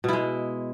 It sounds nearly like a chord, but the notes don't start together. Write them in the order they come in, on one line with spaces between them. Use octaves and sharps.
B2 E4 G#3